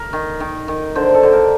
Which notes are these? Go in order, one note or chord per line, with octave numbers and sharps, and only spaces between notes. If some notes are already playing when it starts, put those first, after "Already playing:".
Already playing: A#4
D#3
D#3
D#3
D3 C5
A4
D3
A#4